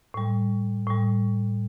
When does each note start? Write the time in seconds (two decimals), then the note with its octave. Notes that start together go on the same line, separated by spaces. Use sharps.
0.14 A2 G3
0.87 A2 G3